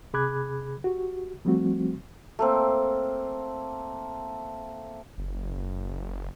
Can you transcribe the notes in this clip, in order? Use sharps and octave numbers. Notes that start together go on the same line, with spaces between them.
C3 G#4 B5 D6 F#6 G#6
F#4 G4
F3 G3 A3 C4 F#4
A3 A#3 C4
F#1